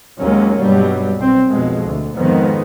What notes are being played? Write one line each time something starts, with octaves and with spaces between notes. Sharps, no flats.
D#2 D#3 F#3 G#3 A#3 C#4
G2 B2 F#3 G3
B1 C4
B1 F2 B2 G#3
D2
F2 G#2 D#3 G#3 B3